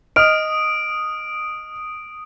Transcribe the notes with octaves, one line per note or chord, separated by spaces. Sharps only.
D#5 D#6 F6 D7